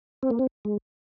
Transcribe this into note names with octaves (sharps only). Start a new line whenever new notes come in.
C4
A#3
C4
G#3